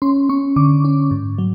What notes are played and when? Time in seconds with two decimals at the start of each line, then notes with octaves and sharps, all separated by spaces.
0.02 C#4 C6
0.29 C#4 C#6
0.56 D3 D6
0.85 C#4
1.11 G#2
1.38 F#3